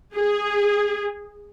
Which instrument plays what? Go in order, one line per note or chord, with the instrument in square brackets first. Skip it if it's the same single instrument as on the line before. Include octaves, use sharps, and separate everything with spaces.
[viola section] G#4